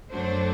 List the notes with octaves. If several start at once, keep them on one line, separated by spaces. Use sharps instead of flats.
F#2 F#3 A3 D4 C5